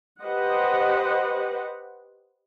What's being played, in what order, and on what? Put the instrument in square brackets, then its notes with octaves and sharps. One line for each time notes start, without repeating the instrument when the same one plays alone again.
[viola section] G4 B4 C5 D#5 F#5